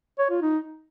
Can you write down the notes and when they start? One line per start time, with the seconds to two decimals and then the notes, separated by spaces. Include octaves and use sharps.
0.19 C#5
0.30 F4
0.42 D#4